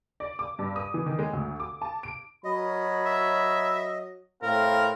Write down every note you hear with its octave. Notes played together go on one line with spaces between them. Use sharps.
D5
D6
G2
D#6
E3
D#3
G#3
D2
D6
A5
D7
F#3 A#4 C#5 D#5 B5
E5
A2 C4 E4 A#4 F5